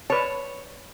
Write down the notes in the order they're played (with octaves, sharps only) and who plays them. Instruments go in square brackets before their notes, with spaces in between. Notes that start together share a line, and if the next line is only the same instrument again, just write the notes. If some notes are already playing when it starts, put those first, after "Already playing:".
[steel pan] B4 A5 [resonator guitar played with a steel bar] C#5